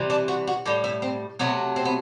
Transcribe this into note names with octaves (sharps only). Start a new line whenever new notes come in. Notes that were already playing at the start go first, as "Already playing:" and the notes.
Already playing: C3 E3 G3
D4
F#4
F#4
A2 G3 G4
E4
C4
C3 F#3 A3 B3
C4
B3